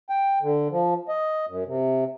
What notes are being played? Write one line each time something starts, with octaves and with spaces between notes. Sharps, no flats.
G5
D3
F3
D#5
F#2
C3